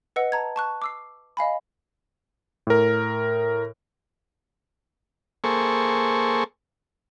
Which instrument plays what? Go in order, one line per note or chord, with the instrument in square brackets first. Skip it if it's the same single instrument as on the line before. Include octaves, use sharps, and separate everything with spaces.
[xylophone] B4 D#5 F#5 E6 C#7
A5 A#5 G#6
A5 C#6 F#6
D6 E6 C7
D#5 F5 G#5 B5
[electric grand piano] A2 A#4
[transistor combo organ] A#3 G#4 A4 C5 C#6